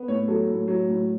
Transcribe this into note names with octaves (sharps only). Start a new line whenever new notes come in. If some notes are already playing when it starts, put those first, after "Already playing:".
Already playing: B3
A2 C#5
F#3 A4
A2
F#3
A2